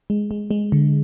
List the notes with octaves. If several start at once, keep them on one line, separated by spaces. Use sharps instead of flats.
G#3
G#3
G#3
D3